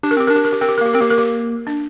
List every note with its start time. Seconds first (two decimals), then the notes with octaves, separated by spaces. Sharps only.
0.03 D4 G4
0.11 A#4
0.17 C4 G4
0.27 D4 A#4
0.36 G4
0.45 A#4
0.52 G4
0.61 C4 A#4
0.69 G4
0.78 A#4
0.81 A#3 G4
0.94 C4 A#4
1.01 A#3 G4
1.10 A#4
1.18 G4
1.67 D4